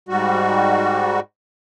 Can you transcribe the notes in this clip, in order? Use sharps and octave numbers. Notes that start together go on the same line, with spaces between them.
G#2 G3 F#4